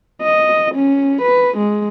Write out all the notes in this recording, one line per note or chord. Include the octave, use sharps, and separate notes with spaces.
D#5
C#4
B4
G#3